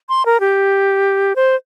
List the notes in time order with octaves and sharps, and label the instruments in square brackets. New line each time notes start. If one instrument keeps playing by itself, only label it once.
[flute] C6
A#4
G4
C5